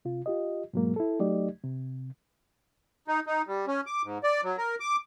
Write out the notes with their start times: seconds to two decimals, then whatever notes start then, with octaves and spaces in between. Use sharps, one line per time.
0.05 C3 F4
0.26 F4 G4 D#5
0.73 G#2 B2 F#3 G#3 A#3
0.96 E4 A4
1.20 F#3 A3 D#4 G4 D5 D#5
1.63 C3
3.08 D#4
3.26 D#4
3.47 G3
3.67 C#4
3.86 D6
4.03 G#2
4.24 D5
4.43 F#3
4.58 A#4
4.80 D6